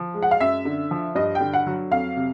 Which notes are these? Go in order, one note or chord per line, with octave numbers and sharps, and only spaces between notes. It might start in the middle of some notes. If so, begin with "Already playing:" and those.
Already playing: F3
G#3
F#5
F5
F#2 E5
D3
F3
G2 D#5
G5
D3
F#5
F#3
F2 F5
C3